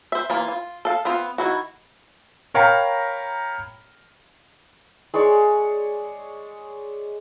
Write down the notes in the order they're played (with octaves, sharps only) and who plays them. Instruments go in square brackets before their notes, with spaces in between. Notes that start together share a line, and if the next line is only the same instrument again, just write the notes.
[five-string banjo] C5 E5
E3 A#3 F4
F4
A4 F5
B3 C4 F4
D#3 F#3 E4 F#4
[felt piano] A#4 C#5 F5 G5 A#5 B5
[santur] G#3 G#4 C#5 D5